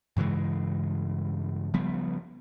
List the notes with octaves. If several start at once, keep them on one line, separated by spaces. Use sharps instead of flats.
G2 C#3 E3 G#3
C#3 F3 G3 B3